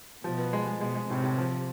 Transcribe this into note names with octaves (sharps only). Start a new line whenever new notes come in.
B2 F3
B3
G#3
G#3
B2 G#3
G#3
A2 C3
A2
F3